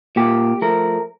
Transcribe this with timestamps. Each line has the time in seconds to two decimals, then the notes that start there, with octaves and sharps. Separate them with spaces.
0.16 A#2 G4
0.62 F3 A3 A#4